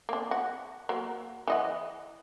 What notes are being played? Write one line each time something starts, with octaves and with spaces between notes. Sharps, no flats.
A#3 D4
F#4
F#3 A#3
E3 D#5 F#5